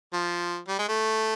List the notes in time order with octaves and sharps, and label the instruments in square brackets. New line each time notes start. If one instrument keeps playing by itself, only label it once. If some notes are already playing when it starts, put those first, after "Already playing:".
[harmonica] F3
G3
G#3
A3